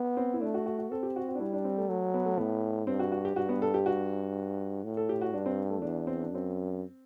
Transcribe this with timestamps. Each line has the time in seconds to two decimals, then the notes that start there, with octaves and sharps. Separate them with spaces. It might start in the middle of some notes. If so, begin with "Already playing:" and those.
Already playing: B3
0.17 C4
0.34 E4
0.41 A3 D4
0.54 F#4
0.66 F#4
0.79 F#4
0.90 C4 A4
1.03 G4
1.16 F#4
1.28 F#4
1.35 D4
1.40 G3 E4
1.53 D4
1.65 C4
1.78 A3
1.89 F#3 A3
2.14 B3
2.25 A3
2.38 A2 B3
2.87 G2 C4
3.00 F#4
3.12 F#4
3.25 G4
3.36 G2 F#4
3.49 B3
3.62 A4
3.74 G4
3.86 F#4
4.84 A2
4.97 A4
5.09 G4
5.21 F#4
5.34 G2 D4
5.46 C4
5.70 A3
5.82 E2 D4
6.07 C4
6.21 D4
6.31 F#2 C4